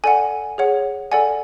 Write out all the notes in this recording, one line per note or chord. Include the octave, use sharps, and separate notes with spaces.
A4 D5 F#5 G#5
G#4 C#5 F#5
A4 D5 F#5 G#5